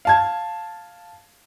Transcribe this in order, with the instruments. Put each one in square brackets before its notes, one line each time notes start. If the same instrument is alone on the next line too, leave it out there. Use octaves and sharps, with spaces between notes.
[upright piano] F5 A5 G#6